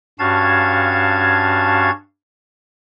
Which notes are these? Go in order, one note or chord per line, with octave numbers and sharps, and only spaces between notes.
G2 C#4 F#4 F5 A5 G#6